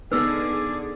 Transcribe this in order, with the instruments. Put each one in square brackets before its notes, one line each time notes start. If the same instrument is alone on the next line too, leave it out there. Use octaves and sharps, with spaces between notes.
[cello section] D3 G#4 [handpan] B3 D#4 [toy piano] B4 E6 [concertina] D5